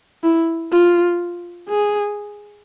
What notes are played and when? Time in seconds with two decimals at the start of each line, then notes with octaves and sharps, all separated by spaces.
0.23 E4
0.72 F4
1.69 G#4